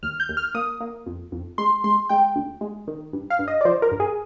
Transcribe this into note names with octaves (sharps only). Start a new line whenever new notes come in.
D#2 F6
G6
D#2
F6
A#3 D#6
A#3
F2
F2
G#3 C6
G#3 C6
G#3 G5
D2
G#3
D#3
G2
F5
G2
D#5
D5
F3 C5
A#4
G2
G#4